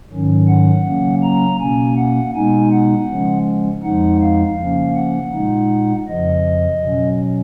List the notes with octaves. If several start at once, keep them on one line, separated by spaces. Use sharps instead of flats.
G#2 D#3 F#3 C#4
F#5
C#3 F#3 A#3 C#4
A#5
B2 A#3 C#4 G#5
F#5
B2 G#3 B3 D#4 G#5
F#5
C#3 F3 G#3 C#4
F2 F3 G#3 D#4 F#5
F5
C#3 F3 A#3 C#4
F#5
A#2 G#3 D#4
F2 C#3 F3 D#5
B2 F#3 C#4